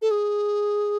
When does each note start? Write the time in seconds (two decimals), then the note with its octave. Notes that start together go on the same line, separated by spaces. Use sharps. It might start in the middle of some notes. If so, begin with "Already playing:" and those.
0.02 A4
0.11 G#4